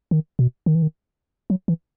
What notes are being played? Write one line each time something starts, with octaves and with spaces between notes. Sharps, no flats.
D#3
B2
D#3
E3
D#3
F#3
E3